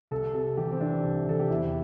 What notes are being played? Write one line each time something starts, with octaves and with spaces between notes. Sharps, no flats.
C2 A4
C3 A4
E3 G4
C4
E3 D4
C2
E3 A4
G4
E2 E4